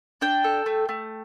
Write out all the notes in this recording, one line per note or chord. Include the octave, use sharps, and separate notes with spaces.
D4 G5
A4
A3
A3